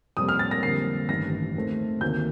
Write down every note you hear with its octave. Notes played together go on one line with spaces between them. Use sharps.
F2 C3 G3 A#3 D#6
F6
A6
A#6
F2 D3 G3 A#3 C7
A1 G2 D#3 A#6
D#2 D#3 A3 C4
D2 C3 D#3 A#3 G6